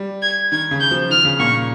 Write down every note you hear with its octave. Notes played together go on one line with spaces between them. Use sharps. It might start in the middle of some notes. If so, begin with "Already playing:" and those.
Already playing: G3
G#6
D#3 G#6
C#3
G6
F3
D#3 F6
C#3
A#2 C#6